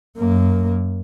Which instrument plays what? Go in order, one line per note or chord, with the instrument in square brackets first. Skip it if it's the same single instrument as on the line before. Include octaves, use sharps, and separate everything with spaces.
[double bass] F#2 A#3